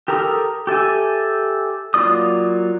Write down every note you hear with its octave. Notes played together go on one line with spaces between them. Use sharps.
G4 A4 A#4 A#5 D#6
G4 A4 E5 G#5
F#3 A#3 F4 D5 D#6